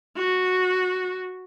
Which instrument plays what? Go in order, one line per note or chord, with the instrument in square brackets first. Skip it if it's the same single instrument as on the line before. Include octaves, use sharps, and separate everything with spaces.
[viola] F#4